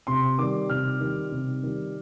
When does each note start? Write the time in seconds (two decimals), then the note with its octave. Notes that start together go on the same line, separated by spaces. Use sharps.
0.07 C3 C6
0.38 D#3 G3 D6
0.69 C3 F6
1.00 D#3 G3
1.32 C3
1.63 D#3 G3